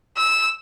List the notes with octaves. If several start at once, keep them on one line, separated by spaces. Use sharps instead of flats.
E6